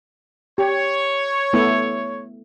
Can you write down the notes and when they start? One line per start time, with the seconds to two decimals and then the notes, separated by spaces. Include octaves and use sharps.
0.58 G4 C#5
1.53 A3 B3 E4